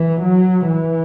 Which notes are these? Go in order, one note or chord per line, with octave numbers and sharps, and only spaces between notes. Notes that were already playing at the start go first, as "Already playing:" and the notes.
Already playing: E3
F#3
E3